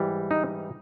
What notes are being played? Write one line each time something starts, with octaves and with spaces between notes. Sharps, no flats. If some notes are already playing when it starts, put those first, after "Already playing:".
Already playing: G#2 E3 G3
D#4